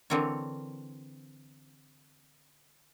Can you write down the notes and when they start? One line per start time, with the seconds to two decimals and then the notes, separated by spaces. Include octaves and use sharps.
0.10 D3 E3 C4 A#4 C#5